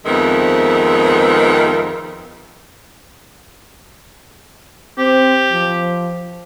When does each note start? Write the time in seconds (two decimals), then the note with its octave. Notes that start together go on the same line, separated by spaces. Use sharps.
0.06 F2 D#3 G#3 B3 C4 E5
4.98 C4 G4
5.52 F3